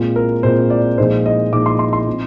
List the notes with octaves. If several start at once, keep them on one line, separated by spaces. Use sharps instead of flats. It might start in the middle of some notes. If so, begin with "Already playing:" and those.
Already playing: A#2 G#3 C4 F4
A#4
A#2 G#3 C4 F4 C5
D5
A#2 F3 G#3 D#4 C5
D#5
A#2 F3 G#3 D#4 D6
C6
C6
C6
F3 C4 D#4